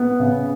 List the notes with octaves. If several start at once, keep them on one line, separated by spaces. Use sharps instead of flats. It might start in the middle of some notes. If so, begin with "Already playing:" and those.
Already playing: B3
C#3